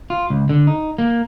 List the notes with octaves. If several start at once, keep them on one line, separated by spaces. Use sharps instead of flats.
F4
C#2
D3
D#4
A#3